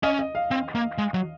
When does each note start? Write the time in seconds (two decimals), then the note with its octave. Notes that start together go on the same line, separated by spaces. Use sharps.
0.03 C#4 D#5
0.19 D#5
0.35 F5
0.51 C4
0.75 A#3
0.98 G#3
1.14 F#3